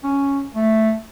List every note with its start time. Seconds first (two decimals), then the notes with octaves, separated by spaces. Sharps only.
0.04 C#4
0.55 A3